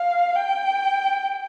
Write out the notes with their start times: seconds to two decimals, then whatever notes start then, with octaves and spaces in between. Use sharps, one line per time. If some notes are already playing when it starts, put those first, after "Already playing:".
Already playing: F5
0.36 G5